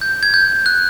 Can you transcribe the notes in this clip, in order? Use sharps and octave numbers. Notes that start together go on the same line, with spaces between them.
G6
G#6
G6
F#6